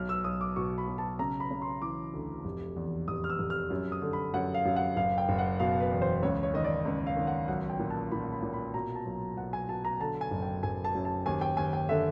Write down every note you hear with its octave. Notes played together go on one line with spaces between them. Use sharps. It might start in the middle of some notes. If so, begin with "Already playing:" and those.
Already playing: B1 F6
E6
B1 D#6
D6
B2 C#6
B5
B1
A5
C#3 A#5
B5
C#3
C6
E3 D6
D2
F1
E2
F1 D#6
F6
E6
F1
F6
F#2
D#6
D3
B5
F#2 F#5
F5
F#2
F#5
F#1 F5
G5
F#1
F#5
B2 F5
B4
E2
C5
C#2 C#5
C#5
D#3 D#5
D5
C#2
F5
D#3
F#5
B1 F#5
G5
A#2
A5
A#2 B5
B5
A#2
B5
B2 A#5
A5
B1
B1 F#5
G#5
B2 A5
A#5
D3 A5
G#5
F#1
G5
F#1 G#5
A5
F#2
A5
D#2 G#5
G5
D#2 G#5
G5
D3 E5